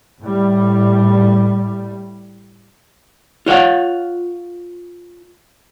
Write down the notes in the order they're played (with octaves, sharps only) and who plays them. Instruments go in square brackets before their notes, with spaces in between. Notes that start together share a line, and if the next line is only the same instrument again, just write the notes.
[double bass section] A2 G3
[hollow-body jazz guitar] F4 C#5 D5 F5 F#5